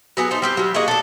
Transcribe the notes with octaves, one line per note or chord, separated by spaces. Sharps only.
F#3 B3 G#4
A3 D#4 C5
G3 C4 G4
F#3 G3
A#3 F#4 G#4 D#5
D4 A4